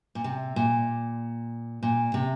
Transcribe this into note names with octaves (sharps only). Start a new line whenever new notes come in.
A#2
C3
A#2
A#2
C3